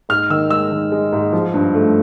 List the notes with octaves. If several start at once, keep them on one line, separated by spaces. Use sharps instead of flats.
G#2 F6
D#3 E6
G#3 E6
D#3
G#3
G#2
F3
G2
A3